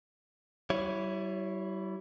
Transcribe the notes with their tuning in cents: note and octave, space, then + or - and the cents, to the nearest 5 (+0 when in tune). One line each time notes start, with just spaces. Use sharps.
G3 -40 E4 +0 C#5 +0